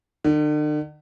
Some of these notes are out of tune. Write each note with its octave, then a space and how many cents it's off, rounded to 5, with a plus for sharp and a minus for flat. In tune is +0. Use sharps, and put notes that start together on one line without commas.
D3 +45